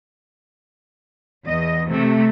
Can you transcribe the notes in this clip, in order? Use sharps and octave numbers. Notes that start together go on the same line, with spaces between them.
E2 D#5
C3 A3